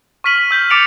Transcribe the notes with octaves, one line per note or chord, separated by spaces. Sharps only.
C#6 F6 B6 D#7 F#7
F#7
E6 G6 B6 F#7
D6 A6 C#7 D7 F7 F#7